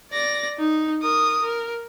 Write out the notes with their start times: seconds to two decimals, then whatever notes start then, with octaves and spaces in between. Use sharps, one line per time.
0.12 D5 A#6
0.58 D#4
1.02 A#4 D#6
1.42 A#4